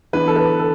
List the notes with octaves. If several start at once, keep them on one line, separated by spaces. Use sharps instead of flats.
E3 B3 D4 B4
A4
B4
A4